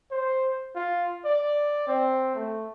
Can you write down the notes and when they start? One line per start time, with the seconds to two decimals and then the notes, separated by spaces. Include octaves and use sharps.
0.11 C5
0.76 F4
1.25 D5
1.88 C4
2.35 A3